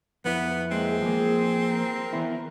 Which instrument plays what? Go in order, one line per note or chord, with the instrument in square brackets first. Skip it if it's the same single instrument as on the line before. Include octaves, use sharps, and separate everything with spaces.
[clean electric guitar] F2 E4 [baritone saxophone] B3
[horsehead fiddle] G#3 A#3 [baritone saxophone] C4
[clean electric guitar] F3 A#3 [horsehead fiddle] G#4
[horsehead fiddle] A#4
[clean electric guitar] E3 B3 E4